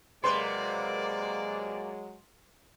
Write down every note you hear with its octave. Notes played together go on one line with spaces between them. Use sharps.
C3 F#3 G#3 A#3 B4 D5 C6